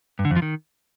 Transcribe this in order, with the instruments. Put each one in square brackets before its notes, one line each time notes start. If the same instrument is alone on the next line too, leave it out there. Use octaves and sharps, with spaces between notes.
[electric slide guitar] G2
D3
F2
F3
D#3